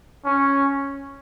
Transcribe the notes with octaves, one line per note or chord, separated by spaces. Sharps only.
C#4